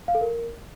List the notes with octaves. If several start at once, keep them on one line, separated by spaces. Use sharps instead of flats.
F5
A4
A#4